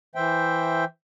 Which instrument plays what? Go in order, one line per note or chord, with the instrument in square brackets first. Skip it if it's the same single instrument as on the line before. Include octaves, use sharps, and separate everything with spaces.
[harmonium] E3 C5 E5 G5